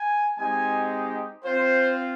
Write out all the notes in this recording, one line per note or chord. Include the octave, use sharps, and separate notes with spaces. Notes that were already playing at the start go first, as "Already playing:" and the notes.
Already playing: G#5
G#3 C4 D#4 G4 G#5
C4 F4 C5